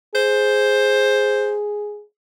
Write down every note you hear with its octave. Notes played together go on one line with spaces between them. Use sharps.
G#4 C5